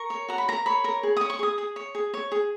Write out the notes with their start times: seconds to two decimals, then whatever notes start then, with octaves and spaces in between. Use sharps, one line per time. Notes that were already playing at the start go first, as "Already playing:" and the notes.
Already playing: A#4 C#6
0.10 C#5
0.28 F#4 A#5
0.38 B5
0.48 A#4 A#5
0.66 C#5 B5
0.84 A#4
1.03 G#4
1.17 C#5 D#6
1.30 C#6
1.39 G#4 D#6
1.58 G#4
1.76 C#5
1.95 G#4
2.14 C#5
2.32 G#4